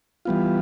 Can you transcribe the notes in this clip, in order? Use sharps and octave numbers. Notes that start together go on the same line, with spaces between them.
E3 G3 B3 F4